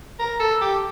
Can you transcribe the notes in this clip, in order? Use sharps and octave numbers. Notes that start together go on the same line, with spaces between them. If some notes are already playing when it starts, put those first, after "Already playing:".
A#4
A4
G4